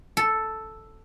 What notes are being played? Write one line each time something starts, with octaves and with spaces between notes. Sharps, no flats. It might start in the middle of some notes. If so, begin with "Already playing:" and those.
A4